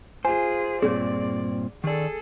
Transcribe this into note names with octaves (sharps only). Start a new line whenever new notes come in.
F4 G#4 C5 G#5
G2 A#2 C4 G#4 C#5 D5
D#3 G#4 A4 D5